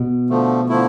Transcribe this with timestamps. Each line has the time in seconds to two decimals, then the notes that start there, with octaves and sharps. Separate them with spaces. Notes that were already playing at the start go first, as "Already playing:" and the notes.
Already playing: B2
0.30 D3 F3 A3
0.69 D3 F3 A3 E4